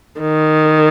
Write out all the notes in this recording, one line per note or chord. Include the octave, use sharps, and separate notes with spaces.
D#3